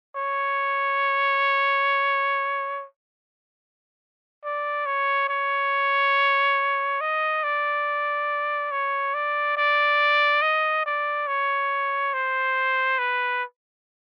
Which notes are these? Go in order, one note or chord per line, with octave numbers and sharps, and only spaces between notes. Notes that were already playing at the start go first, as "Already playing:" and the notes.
C#5
D5
C#5
C#5
D#5
D5
C#5
D5
D5
D#5
D5
C#5
C5
B4